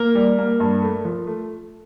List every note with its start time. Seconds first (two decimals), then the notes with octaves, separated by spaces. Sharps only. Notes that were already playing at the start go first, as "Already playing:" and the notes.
Already playing: A#3 A#4
0.15 G3
0.38 A#3
0.60 G2
0.82 A3
1.05 F3
1.27 A3